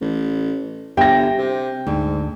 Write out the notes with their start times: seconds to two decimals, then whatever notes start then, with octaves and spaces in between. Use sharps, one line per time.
0.01 A1
0.97 G1 G4 E5 G5 A#6
1.38 C3
1.87 D2 G#2